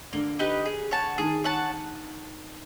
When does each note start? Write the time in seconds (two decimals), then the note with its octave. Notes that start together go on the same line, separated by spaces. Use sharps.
0.13 D3 A#3
0.39 D#4 G4 B4
0.65 G#4
0.91 C#5 F#5 A5
1.18 D#3 G#4
1.44 C#5 F#5 A5